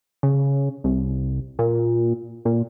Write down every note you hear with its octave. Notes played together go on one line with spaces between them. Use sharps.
C#3
C2
A#2
A#2